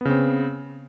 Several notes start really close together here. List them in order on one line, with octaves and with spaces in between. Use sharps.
B3 C#3 C4